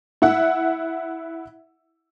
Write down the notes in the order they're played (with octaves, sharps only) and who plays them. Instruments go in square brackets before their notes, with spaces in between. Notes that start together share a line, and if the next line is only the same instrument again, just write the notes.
[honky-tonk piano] E4 E5 F#5